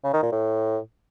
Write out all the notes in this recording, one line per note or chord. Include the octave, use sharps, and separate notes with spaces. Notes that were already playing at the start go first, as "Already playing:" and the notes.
C#3
D#3
A#2
A2